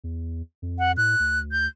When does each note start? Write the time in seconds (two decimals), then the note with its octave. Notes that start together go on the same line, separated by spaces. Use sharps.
0.04 E2
0.62 F2
0.79 F#5
0.97 A2 F#6
1.20 D2
1.52 G6